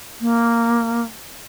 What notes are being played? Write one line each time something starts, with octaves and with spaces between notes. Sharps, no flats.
A#3